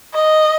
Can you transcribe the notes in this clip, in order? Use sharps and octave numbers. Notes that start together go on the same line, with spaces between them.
D#5